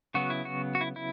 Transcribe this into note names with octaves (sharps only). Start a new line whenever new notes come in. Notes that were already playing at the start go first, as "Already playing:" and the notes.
C#3 F#3 B3 F#4
E4
F#4
F#4
E4
E4